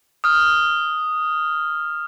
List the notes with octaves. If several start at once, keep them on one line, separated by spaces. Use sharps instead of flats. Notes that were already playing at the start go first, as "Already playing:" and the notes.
D#6 F6